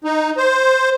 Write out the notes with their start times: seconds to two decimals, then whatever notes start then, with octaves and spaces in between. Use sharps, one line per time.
0.04 D#4
0.37 C5